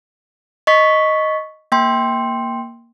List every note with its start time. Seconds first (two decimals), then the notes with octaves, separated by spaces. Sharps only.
0.67 D#5 C#6 B6
1.72 A#3 G5 C6